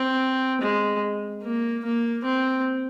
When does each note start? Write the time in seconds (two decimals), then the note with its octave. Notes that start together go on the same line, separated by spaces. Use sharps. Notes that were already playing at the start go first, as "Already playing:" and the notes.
Already playing: C4
0.61 G#3
1.43 A#3
1.84 A#3
2.24 C4